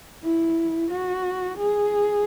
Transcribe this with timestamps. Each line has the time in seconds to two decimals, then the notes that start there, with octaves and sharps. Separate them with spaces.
0.23 E4
0.91 F#4
1.58 G#4